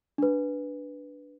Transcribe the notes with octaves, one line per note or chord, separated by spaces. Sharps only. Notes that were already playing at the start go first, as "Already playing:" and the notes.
D4 B4